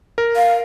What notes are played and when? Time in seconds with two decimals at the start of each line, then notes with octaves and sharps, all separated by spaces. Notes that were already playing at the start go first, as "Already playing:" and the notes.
0.18 A#4
0.36 F5